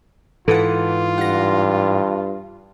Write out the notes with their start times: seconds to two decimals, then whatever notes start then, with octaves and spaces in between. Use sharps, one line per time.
0.48 G#2 E3 F4 A4 B4 F#5
1.18 G2 F#5 A#6